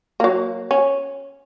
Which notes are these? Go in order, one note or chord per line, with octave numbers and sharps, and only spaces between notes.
F#3 A#3
C#4